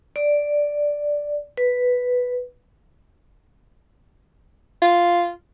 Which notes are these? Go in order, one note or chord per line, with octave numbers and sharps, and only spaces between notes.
D5
B4
F4